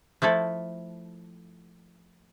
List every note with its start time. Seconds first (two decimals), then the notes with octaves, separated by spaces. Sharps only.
0.22 F3 A3 E4 A4